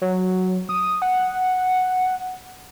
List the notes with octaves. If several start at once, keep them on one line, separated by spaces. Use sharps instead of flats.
F#3
D#6
F#5